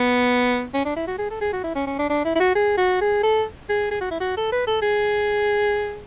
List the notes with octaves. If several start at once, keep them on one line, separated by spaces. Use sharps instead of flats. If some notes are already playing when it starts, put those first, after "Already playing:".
Already playing: B3
C#4
D4
E4
F#4
G#4
A4
G#4
F#4
E4
C#4
C#4
D4
D4
E4
E4
F#4
G#4
F#4
G#4
A4
G#4
G#4
F#4
E4
F#4
A4
B4
A4
G#4